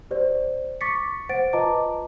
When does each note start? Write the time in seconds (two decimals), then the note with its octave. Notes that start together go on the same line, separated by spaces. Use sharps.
0.11 G4 C5 D5
0.81 C#6 D6 A6 B6 C#7
1.29 C5 F#5 A6 D7
1.53 F4 B4 D#5 A5 A#5 D6